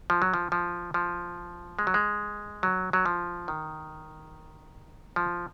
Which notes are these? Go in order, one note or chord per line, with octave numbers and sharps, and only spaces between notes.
F3
F#3
F3
F3
F3
G#3
F#3
G#3
F#3
F#3
F3
D#3
F3